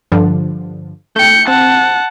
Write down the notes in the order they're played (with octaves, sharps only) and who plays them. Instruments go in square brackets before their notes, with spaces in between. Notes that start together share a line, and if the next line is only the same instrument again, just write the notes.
[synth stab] G2 D3 F3
[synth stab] A3 G5 [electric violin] G6 C#7
[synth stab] C4 [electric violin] F#5 A5